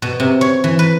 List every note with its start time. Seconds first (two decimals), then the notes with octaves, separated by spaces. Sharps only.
0.02 B2
0.20 C3
0.41 C#5
0.64 E3
0.79 B4